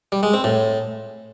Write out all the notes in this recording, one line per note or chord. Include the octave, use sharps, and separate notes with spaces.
G3
G#3
C4
A2